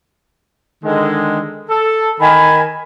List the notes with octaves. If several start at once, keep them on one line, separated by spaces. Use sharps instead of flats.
D3 D#3 G#3
A4
D#3 G#5 B5